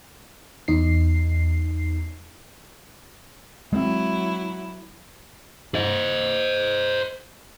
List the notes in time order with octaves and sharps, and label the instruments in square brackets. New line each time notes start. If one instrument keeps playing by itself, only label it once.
[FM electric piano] E2 D#4 C7
[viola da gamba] F#3 E4 [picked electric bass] G#3 A3 C4
[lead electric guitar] C5 D#5